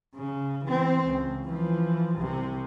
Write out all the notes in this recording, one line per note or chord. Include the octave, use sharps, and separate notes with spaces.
C#3
E3 C4
C#2
E3 F3
C2 C3